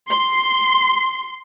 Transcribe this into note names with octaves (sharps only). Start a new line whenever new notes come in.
C6